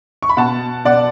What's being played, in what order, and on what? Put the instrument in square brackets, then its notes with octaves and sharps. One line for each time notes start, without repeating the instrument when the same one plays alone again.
[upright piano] C#6
B5
B2 F#5 A5
B2 D5 F#5